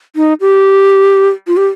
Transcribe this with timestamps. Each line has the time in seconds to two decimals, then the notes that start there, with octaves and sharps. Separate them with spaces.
0.16 D#4
0.41 G4
1.47 F4
1.57 G4